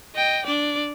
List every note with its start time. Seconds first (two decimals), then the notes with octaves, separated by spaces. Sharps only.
0.15 D#5 G5
0.46 D4 D5